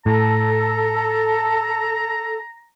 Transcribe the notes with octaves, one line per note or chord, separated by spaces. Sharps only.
A2 A4 A#5